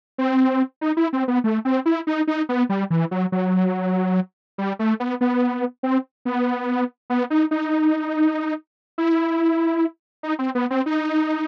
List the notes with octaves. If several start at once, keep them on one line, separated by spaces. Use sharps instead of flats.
C4
D#4
E4
C4
B3
A3
C4
E4
D#4
D#4
B3
G3
E3
F#3
F#3
G3
A3
B3
B3
C4
B3
B3
D#4
D#4
E4
D#4
C4
B3
C4
D#4